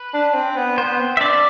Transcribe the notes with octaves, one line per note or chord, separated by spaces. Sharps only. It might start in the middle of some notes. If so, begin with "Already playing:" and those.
Already playing: B4
D4
C4
B3
B3 C5
C4
E5
D4 D5